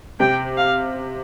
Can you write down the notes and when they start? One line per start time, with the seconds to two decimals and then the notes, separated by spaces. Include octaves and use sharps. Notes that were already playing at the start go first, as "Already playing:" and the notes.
0.20 C3 G5
0.57 F5